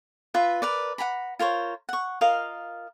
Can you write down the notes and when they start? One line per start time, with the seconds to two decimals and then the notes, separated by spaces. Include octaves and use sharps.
0.34 F4 B4 E5
0.62 A#4 B4 D5
0.98 F#5 G#5 A#5 B5
1.39 F4 A#4 C5 C#5
1.89 F#5 C#6
2.21 F4 A#4 D#5 F5